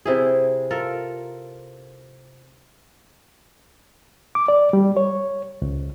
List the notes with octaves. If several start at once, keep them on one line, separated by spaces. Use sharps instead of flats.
C3 E4 G#4
F4 A4 A#4
D6
D5
G3
C#5
C#2